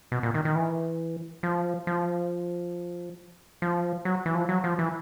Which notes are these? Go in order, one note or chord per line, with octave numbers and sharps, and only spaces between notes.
B2
A#2
D#3
D#3
E3
F3
F3
F3
F#3
E3
F3
F#3
F3
E3